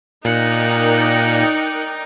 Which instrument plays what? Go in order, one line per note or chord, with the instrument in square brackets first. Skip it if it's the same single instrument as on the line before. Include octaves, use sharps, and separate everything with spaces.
[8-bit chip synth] A#2 [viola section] D#4 [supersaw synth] A#4 D5 G5 [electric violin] F#6 C#7